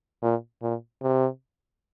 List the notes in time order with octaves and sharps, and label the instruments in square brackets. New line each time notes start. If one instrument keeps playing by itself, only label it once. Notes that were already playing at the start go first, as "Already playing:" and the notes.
[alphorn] A#2
A#2
C3